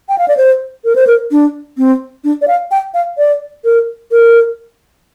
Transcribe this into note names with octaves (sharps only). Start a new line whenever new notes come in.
G5
F5
D5
C5
A#4
C5
A#4
D4
C4
D4
D5
F5
G5
F5
D5
A#4
A#4